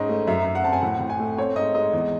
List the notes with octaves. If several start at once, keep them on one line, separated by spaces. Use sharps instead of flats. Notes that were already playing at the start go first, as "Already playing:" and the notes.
Already playing: G#2 C#4 D#5
A3
F#2 E5
F#2
F#5
C4 A5
G#5
A2 F#5
A2
G#5
A3
C4 C#5
G#2 D#5
G#3 D#5
E2